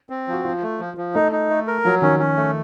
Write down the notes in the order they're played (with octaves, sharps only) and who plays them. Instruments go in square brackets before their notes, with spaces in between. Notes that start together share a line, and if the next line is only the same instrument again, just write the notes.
[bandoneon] C4
F3
[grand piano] F#4
[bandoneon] F3 [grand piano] F4
[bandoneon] A3
F3
F3
[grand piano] A3 [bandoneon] D#4
[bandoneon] D#4
A3
A#4
[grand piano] F3 [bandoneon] F#3
[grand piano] D#3 [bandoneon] C#4
[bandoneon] C#4
A3